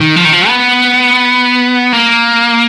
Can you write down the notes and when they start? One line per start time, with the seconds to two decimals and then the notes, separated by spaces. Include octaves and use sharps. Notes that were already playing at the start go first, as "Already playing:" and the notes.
0.01 D#3
0.16 F3
0.25 D#3
0.33 F3
0.48 B3
1.93 A#3